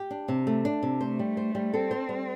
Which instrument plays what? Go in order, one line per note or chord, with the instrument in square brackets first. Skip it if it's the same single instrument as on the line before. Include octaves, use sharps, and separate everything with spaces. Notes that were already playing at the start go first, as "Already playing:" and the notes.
Already playing: [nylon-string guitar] G4
D4
C3
A3
D4
C3
[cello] A3 [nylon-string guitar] C5
[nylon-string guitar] G3
C5
G3
[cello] C4 [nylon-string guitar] A4
[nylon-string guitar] C5
G3